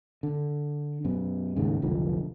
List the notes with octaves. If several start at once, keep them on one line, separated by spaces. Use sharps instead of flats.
D3
F#2 B2
D#2 G#2 C#3
F1 B1 D3 F3